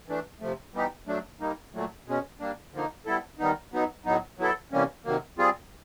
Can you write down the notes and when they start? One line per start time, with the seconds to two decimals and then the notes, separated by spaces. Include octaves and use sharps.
0.08 E3 A3 D4
0.40 C3 F3 A3
0.74 E3 G3 B3 D#4 G4
1.07 F#3 A3 D4
1.40 G3 A#3 D#4
1.73 A#2 F#3 A3
2.06 B2 G#3 C#4
2.40 G3 A#3 D4
2.73 D3 F3 A#3 D#4
3.06 G3 B3 E4 A4
3.39 D#3 G3 B3 D#4
3.72 F#3 B3 D#4
4.05 A2 F#3 B3 D#4
4.39 F#3 B3 E4 A4
4.72 C3 E3 G3 A#3 C#4
5.05 C3 D#3 F#3 A#3
5.38 G3 C4 F4 G#4